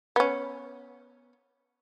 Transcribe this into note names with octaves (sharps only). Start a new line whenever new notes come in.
B3 C#4